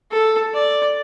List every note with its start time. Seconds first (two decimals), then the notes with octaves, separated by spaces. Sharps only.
0.11 A4
0.54 D5